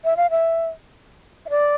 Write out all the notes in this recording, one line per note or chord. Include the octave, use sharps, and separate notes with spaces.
E5
F5
E5
E5
D5